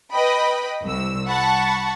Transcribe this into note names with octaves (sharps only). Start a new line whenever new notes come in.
B4 D#5 G5 B5
C2 E6
F#5 A5 B5 C#6